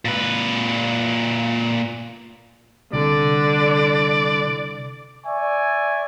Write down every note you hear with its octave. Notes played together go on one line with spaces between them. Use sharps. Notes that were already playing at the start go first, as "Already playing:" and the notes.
A#2 B4
C2 D3 D5
D5 E5 G#5 C#6